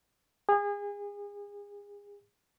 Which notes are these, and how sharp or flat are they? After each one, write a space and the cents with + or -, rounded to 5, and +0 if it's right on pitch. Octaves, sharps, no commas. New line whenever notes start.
G#4 -30